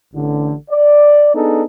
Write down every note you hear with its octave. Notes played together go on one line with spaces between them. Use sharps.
A1 D3
D5
B3 D4 D#4 G#4 A4